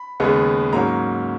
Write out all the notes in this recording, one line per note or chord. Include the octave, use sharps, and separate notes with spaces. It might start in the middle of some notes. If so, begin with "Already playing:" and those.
Already playing: B5
D#2 C#3 G#3 B3
G#2 F#3 A#3 C#4 A#5